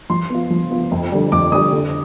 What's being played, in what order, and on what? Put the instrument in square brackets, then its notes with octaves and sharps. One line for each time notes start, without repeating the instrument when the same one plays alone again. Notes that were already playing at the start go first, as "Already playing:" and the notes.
[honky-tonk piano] F3 [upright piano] C6
[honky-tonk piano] B3 F4
F3
B3 F4
F2
D3 G3
[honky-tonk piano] F2 [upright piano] D6
[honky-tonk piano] D3 [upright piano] D#6
[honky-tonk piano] G3
D3